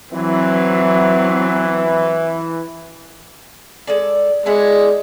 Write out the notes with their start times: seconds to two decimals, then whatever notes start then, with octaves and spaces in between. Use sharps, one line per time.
0.13 E3 F#3 C4
3.87 G#3 A4 D5
4.46 G#3 D4 E4 F#5